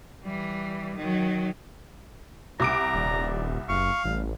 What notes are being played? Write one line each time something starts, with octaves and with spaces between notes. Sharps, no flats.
E3 G3
D#3 F#3
C2 A#5 D6 D7
D#1 D5
F#1 F5 C#6
A1 G3